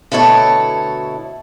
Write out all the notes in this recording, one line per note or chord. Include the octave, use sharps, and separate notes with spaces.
D2 B2 E4 A4 C#5